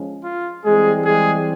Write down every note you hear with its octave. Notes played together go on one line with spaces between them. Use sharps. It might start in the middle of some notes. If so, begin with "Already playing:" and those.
Already playing: F3 G#3 C#4
F4
E3 G3 G#3 C4 G#4
G#3 G#4